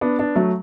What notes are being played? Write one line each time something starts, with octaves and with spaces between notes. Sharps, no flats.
B3 D4
B3 D4
F#3 A3